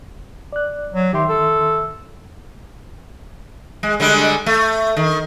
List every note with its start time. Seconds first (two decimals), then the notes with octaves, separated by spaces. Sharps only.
0.53 D5 F#6
0.93 F#3
1.13 D#3 G4 E5 C6
1.28 A4
3.83 G#3
4.00 D3 G3 G#3
4.46 A3
4.97 D#3